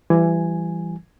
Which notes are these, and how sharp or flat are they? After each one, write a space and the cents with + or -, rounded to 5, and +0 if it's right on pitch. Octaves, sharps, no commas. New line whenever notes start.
E3 +25 G3 +0 G#5 +0